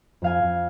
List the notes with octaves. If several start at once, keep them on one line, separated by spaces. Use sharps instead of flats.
F2 F5 G#5
F2